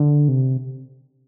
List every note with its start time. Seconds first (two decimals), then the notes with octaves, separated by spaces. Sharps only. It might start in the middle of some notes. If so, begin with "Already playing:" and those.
Already playing: D3
0.28 C3